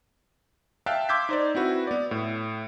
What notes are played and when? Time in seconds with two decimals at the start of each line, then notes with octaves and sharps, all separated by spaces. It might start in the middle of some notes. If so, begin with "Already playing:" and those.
0.86 E5 F5 G5 A5 F#6
1.09 C6 D6 E6 G6 G#6 B6
1.29 D#4 C5 D5
1.55 C4 E4 F#4 B4
1.87 B3 D5
2.11 A2